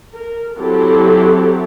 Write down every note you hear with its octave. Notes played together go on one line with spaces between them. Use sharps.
A#4
F#3 C4 E4 G4 A4